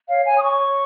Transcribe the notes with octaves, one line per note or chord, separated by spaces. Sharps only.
C#5 F5
C#5 G#5
D#6
C#5 C#6
C#5